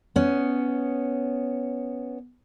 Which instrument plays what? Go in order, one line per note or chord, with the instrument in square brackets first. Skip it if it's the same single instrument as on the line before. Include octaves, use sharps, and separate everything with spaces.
[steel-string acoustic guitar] B3 C#4